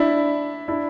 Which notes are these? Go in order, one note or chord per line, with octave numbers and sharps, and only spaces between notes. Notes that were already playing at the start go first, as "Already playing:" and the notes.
Already playing: D4 E4
D4 E4